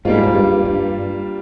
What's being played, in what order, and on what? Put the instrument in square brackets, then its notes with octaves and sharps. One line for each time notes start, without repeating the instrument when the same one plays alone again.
[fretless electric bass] G#2 [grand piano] G3 A#3 F4
[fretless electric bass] G#2
G2
G2